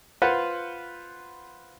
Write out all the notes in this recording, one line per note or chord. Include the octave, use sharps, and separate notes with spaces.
F4 B4 C5 F#5